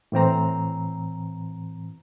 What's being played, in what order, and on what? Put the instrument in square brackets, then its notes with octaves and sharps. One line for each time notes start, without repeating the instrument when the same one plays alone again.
[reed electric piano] A2 E3 C4 A#5